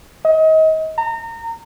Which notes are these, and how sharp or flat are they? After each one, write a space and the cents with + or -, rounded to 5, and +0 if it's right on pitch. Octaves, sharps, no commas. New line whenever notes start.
D#5 +30
A#5 -30